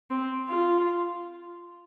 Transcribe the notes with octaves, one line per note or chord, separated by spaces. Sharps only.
C4
F4